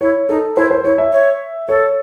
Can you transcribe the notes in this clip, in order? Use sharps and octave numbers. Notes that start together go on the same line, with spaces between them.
E4 C#5
D#4 A4
E4 C5
C5
E4 C#5
E5
C#5
A4 C#5